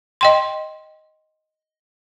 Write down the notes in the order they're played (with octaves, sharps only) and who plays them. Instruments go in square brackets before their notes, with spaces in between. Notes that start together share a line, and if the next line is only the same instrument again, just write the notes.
[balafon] D#5 G5 C6